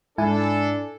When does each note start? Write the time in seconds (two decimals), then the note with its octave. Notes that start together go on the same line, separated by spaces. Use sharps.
0.18 G#2 D4 E4 A4 G#5